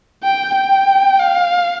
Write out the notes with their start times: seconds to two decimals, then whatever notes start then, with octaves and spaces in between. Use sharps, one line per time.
0.24 G5
0.55 G5
1.19 F5